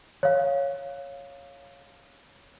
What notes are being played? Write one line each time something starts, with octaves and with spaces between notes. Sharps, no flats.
C#5 F5